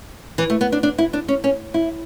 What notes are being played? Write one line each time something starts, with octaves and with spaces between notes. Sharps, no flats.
E3
A3
B3
D4
D4
E4
D4
C#4
C#4
E4